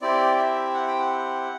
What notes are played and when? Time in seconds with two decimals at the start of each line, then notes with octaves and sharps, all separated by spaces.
0.02 C4 E4 G4 D5
0.38 E5
0.74 F#5
0.87 G5
0.99 F#5